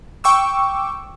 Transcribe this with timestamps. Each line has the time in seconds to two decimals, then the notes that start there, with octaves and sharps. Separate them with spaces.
0.24 G5 C#6 D6 E6